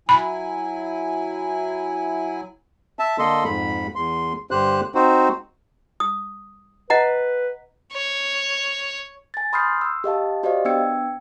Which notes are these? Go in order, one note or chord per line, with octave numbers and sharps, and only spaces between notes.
F#3 E4 G#5 B5
E5 A5
D3 A#3 A4 D#5 C6
F2 G#2 B5
E2 C6
G2 D3 G4 C5 F#6
C4 D#4 F#4 C5
D#6
B4 D#5 F#5 A#5
C#5
G#5 A6
B5 C6 D#6 F6 G6 C7
E6
G4 D#5 F5 A5
F#4 G4 C5 D5 D#5 F5
B3 D4 G5 E6 G#6 C#7